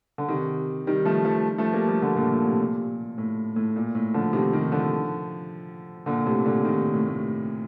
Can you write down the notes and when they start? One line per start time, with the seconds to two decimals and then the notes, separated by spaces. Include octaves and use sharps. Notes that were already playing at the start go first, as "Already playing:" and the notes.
0.18 D3
0.28 C3 D#3
0.87 D#3 G3
1.05 F3 A3
1.25 F3 A3
1.58 F3 A3
1.73 G3 A#3
1.88 F3 A3
2.02 D3 F3
2.16 A#2 D3
2.31 A#2
2.45 A2 C3
2.60 A#2
3.18 A2
3.56 A2
3.76 A#2
3.95 A2
4.14 D3 F3
4.33 C3 D#3
4.53 C3 D#3
4.72 D3 F3
6.06 A#2 D3
6.26 A2 C3
6.45 A#2 D3
6.65 C3 D#3
6.94 A2 C3
7.08 A2